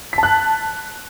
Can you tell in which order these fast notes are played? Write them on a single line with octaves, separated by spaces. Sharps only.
B6 A5 F#6